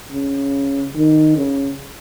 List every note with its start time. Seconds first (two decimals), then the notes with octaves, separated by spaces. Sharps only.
0.12 C#3
0.95 D#3
1.36 C#3